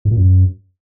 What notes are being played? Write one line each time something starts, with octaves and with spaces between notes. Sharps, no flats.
G#2
A#2
F#2